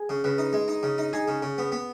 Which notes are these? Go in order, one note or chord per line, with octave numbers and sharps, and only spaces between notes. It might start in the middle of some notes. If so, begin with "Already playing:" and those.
Already playing: G#4
C#3
C#3 B4
D#4
G#3
D#4
C#3
D#4
D#4 G#4
C#3
C#3
B3
B3